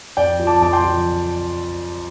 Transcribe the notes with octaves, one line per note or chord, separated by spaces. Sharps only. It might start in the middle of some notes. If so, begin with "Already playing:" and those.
F2 D5 G5
F3
A5 D6
F2 A5 D6
G5 C6
F3